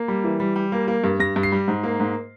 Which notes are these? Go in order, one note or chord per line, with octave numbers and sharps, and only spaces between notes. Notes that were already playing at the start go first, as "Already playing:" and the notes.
Already playing: A#3
G3
E3
G3
G3
A#3
A#3
G2
G2 A#6
G2
C7
G3
G#2
A#3
G#2